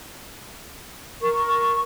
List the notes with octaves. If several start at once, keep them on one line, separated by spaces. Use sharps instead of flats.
A#4 C#6